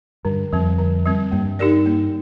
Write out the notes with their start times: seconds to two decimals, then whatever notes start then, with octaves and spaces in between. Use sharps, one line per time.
0.25 G2 D3
0.53 F2 G3 C4
0.79 D3
1.05 G3 C4
1.32 G2 A#3
1.59 D#4 G4 A#4 D5
1.86 A#3